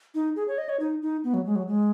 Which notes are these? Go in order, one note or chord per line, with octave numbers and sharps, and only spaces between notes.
D#4
G#4
C#5
D#5
C#5
D#4
D#4
B3
F#3
G#3
F#3
G#3